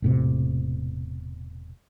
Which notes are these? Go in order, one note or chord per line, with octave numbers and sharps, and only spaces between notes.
E1 A2 C3